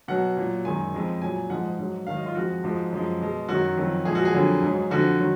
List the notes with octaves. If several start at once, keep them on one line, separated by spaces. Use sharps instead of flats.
B2 F#3 F#5
A#2 F#3
F#2 D#3 G#3 G#5
F2 F3 G#3
A#2 F#3 G#5
G#2 F3 G#3 F#5
G#2 F#3
G#2 D#3 F#3 F5
D#5
F4
F2 F3 G#3 F#4
G#2 F3 G#3
F#2 F3 G#3
B2 G#3
F#2 D#3 F#3 F#4
F2 D#3 F#3
A#2 F3 G#3 G#4
F#4
G#4
F2 D3 F#3
G#2 F#3
F2 D3 F3 F#4
D#3 F#3